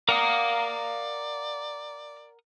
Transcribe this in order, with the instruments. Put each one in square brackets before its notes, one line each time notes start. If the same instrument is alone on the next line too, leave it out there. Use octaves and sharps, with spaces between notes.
[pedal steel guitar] A#4 F#5 D#6 [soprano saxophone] D5 [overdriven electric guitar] F5 A#5